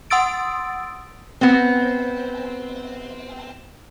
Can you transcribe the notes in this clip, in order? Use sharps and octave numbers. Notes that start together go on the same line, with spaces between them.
F#5 C6 D#6 E6 A6 D7
B3 C4